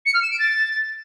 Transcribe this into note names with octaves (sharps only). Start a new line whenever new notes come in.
C#7
F6
E7
D7
A6